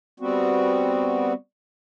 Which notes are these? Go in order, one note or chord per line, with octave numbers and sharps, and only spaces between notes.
G3 B3 C4 F#4